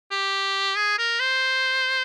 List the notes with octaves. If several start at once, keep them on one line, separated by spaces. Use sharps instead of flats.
G4
G#4
A#4
C5